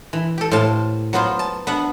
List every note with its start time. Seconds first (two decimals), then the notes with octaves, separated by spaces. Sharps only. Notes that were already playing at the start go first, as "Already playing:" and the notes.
0.13 E3
0.38 G4 A4
0.51 A2 C5 F5 A5
1.13 F#3 B3 F4 C5
1.39 A5
1.67 B3 D4 E5 F#5